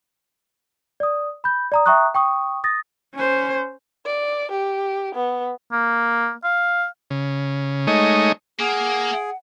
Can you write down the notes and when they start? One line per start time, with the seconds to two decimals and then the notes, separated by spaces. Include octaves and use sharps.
1.00 D5 D#6
1.44 B5 G6
1.72 D5 A#5 D#6
1.86 E5 G5 A#5 C#6 D#6 F#6
2.15 G5 C#6 D#6
2.64 D#6 A6 A#6
3.15 C#4 C5
4.06 D5
4.51 G4
5.15 B3
5.72 A#3
6.44 F5
7.10 C#3
7.87 G#3 A3 D#4 C#5 D#5
8.60 A#3 G#4 F#5